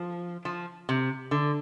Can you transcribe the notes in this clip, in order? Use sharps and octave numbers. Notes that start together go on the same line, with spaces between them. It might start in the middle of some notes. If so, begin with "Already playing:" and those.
Already playing: F3
F3
C3
D3